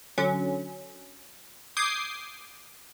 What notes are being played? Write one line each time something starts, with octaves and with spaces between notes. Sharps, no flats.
D3 F#3 C#4
D6 D#6 G6 G#6 C7